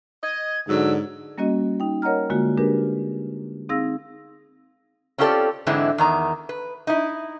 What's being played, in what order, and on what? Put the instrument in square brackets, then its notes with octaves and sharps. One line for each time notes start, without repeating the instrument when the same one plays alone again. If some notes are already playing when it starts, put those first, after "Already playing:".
[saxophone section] D#5 [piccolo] G#6
[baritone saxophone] G#2 [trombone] D3 [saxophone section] F#3 [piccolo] E6
[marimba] G3 A#3 C#4 F#4 D#5
D#4 G5
A#4 C#5 D#5 F#5 A#5 F6
D3 G#3 A#3 F4 F#4
G#3 D4 G4 G#4 A#4 B4
C4 D#4 G#4 F5 E6 A#6
[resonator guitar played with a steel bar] C4 C#4 F4 G4 A4 D5
G#2 D3 E3 G#3 C4 E4
E2 D#3 A#5
B4
D#4 E4